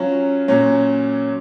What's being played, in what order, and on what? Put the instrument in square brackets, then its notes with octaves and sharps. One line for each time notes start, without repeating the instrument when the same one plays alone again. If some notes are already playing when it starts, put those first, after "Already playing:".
Already playing: [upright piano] F#3 C#4 F4
A#2 F#3 C#4